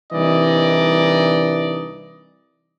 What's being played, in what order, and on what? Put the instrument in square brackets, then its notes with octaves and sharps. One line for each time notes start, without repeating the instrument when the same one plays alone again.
[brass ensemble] C2 E3 D4 D#4 D5 D#5